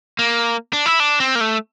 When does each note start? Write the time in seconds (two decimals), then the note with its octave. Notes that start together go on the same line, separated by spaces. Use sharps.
0.19 A#3
0.73 D4
0.86 E4
1.00 D4
1.20 C4
1.35 A#3
1.41 A3